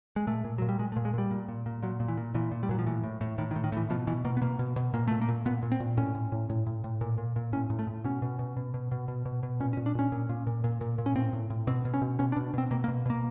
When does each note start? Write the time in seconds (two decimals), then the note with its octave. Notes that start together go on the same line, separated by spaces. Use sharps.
0.16 G#3
0.27 A#2 A3
0.45 A#2
0.58 A#2 F#3
0.69 G3
0.79 A#2 G#3
0.92 A3
0.96 A#2
1.05 G#3
1.14 A#2 G3
1.31 A#2
1.49 A#2
1.66 A#2
1.83 A#2 F#3
2.00 A#2
2.08 E3
2.17 A#2
2.35 A#2 E3
2.52 A#2
2.63 G3
2.69 A#2 F#3
2.79 F3
2.86 A2 E3
3.04 A2
3.21 A2
3.38 A2 D#3
3.51 D#3
3.56 A2
3.64 D#3
3.72 A2 E3
3.90 B2 F3
4.07 B2 E3
4.25 B2 A#3
4.37 B3
4.41 B2 A#3
4.59 B2
4.76 B2
4.94 A#2 A#3
5.08 A#2 A3
5.21 A#3
5.28 A#2
5.45 A#2 B3
5.62 A#2
5.72 C4
5.80 A#2
5.97 A2 C#4
6.15 A2
6.32 A2
6.50 A2
6.66 A2
6.84 A2
7.01 A#2
7.18 A#2
7.36 A#2
7.53 A2 C#4
7.70 A2
7.79 A3
7.87 A2
8.04 B2 C#4
8.22 B2
8.39 B2
8.57 B2
8.74 B2
8.92 B2
9.08 B2
9.26 B2
9.43 B2
9.60 A#2 C#4
9.73 C#4
9.77 A#2
9.86 D4
9.95 A#2 C#4
10.12 A#2
10.29 A#2
10.47 A#2
10.64 A#2
10.81 A#2
10.98 A#2
11.06 C#4
11.15 A2 C4
11.33 A2
11.50 A2
11.67 B2 C4
11.85 B2
11.94 C#4
12.02 B2
12.19 B2 C#4
12.32 D4
12.37 B2
12.54 B2 C4
12.71 B2 A#3
12.84 A#3
12.88 B2
13.06 B2 A#3